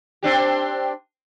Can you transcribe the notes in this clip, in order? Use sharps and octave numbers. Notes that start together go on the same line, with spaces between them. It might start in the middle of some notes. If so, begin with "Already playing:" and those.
C4 D4 G4